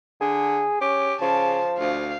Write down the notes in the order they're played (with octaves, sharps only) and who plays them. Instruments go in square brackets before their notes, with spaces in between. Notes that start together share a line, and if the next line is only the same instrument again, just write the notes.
[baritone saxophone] D3 [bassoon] G#4
[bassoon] C#4 [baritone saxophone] G4
[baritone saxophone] C#3 [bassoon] F3 [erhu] A5
[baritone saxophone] D2 [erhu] F5